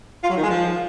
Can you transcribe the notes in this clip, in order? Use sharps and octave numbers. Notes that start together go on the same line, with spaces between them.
F4
F#3
D#3
G#3
F3